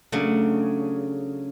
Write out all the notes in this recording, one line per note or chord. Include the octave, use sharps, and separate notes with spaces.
C#3 F#3 A3 D4